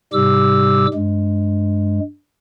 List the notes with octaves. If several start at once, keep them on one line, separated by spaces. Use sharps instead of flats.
G#2 C3 G3 G4 D6 E6
G2 G#3